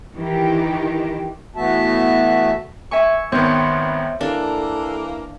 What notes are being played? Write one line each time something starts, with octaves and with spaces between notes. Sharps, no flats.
D#3 E3 G4
E3 A3 B3 F#4 E5 A5
E5 G#5 C#6
G#1 D#3 B3 C4 C#5 C#6
E3 A#3 D4 A4